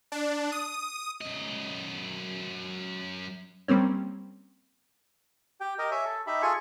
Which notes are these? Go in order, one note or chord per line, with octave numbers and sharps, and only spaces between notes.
D4
D#6
F#2 D#5
G3 A#3 C4 C#4
G4 G5
G4 A#4 D#5
C#5 E5 G#5
A4
D#4 G4 E5 B5
F4 G#4 A4 G#5 C#6